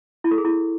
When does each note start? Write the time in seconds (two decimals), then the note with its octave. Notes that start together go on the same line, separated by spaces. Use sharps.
0.24 E4
0.31 A4
0.38 G#4
0.45 E4